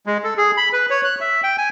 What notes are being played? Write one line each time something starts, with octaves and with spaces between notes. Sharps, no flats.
G#3
A4
G#4
B5
B4
C#5
F#6
E5
G5
G#5